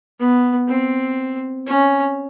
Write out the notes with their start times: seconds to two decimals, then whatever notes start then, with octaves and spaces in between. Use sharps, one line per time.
0.19 B3
0.68 C4
1.66 C#4